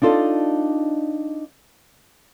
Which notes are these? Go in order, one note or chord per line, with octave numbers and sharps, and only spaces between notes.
D4 D#4 F4 A4 D5 D#5